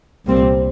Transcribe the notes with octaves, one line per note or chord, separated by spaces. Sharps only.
C2 A#2 G3 C4